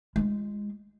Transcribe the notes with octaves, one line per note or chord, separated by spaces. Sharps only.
G#3 F4